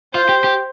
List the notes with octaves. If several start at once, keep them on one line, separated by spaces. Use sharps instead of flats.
F4 C5
G4
G4